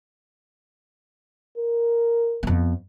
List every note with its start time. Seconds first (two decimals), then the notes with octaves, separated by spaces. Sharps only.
1.58 A#4
2.43 F2 B3